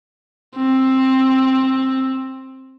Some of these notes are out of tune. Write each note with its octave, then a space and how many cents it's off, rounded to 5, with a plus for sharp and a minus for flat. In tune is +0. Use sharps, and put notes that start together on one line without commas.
C4 +10